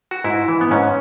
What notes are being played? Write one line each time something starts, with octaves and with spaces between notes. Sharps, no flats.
F#4
G#2 E4
E3
B3
G#2 C#4